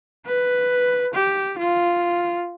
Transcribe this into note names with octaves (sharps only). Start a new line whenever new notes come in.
B4
G4
F4